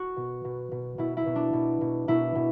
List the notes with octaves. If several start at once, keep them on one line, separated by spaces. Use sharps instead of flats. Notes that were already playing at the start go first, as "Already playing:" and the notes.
Already playing: F#4
B2
B2
B2
B2 E4
E4
B2
D4
B2
B2
B2 E4
B2